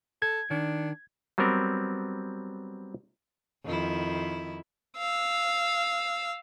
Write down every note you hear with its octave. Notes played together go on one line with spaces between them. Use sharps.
A4 G#6
D#3 D4
F#3 G3 B3 C4 A#4
F2 D#3 E4
F5 E6